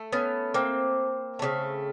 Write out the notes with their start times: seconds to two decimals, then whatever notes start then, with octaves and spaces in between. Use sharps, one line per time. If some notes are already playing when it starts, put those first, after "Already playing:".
Already playing: A3
0.13 B3 C#4
0.54 A#3 C4
1.39 C#3 F#3 A3